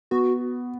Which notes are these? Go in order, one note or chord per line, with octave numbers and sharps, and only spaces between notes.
B3 F#4